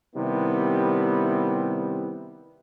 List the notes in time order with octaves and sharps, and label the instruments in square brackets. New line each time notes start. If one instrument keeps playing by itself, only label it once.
[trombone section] C3 D#3 G3 B3 E4